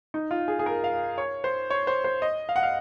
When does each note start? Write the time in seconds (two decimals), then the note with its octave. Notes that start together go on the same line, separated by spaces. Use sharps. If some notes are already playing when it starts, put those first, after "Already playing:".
0.14 D#4
0.31 F4
0.48 G#4
0.59 G#4
0.66 A#4
0.84 F5
1.18 C#5
1.44 C5
1.70 C#5
1.87 C5
2.04 C5
2.22 D#5
2.49 F5
2.56 F#5
2.63 F5